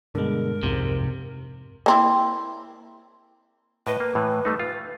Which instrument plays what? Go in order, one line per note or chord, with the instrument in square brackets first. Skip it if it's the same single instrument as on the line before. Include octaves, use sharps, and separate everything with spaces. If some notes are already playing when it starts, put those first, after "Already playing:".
[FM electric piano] G2 G#3 [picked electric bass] B2 D3 [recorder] A#4
[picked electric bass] C2 F2 G#2 [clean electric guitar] C3
[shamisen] A#3 C4 E4
[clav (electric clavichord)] A2 D#5 [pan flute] B4
[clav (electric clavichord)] A#3
A2 E3
G3 A3 D#4
F4